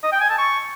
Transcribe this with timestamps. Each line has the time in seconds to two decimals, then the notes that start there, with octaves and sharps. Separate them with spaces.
0.03 D#5
0.12 G5
0.21 G#5
0.30 A5
0.38 C#6